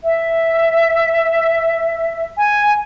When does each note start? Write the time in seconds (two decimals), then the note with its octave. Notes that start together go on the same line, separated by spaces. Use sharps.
0.03 E5
2.37 G#5